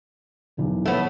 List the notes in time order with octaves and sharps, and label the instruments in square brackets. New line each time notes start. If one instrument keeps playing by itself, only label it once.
[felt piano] F#1 B1 E2
[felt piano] D#1 C#5 [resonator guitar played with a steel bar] A3 B3